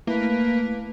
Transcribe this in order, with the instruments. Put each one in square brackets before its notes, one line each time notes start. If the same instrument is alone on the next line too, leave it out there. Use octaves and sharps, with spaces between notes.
[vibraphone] A3 [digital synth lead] A#3 [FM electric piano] E4 [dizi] B4